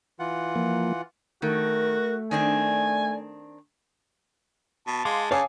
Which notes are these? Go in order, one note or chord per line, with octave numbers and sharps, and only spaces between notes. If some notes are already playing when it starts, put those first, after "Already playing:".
E3 F4 F#5
F3 A#3
D#3 A3 F#4 A#4
D#3 C4 D4 D5 G#5
B2 A5
G#3 F5 C6 D6
C#3 C#5 F5 G#5 D6 D#6